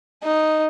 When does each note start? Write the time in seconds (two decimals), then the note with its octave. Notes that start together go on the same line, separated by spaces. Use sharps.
0.23 D#4